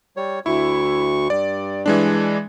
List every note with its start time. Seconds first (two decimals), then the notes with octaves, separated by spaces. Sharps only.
0.17 G3 C#5
0.46 D2 E4 C#6
1.30 G2 D5
1.86 E3 G#3 D4